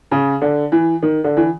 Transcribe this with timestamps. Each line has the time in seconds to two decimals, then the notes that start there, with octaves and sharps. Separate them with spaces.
0.11 C#3
0.41 D3
0.72 E3
1.02 D#3
1.24 D3
1.37 E3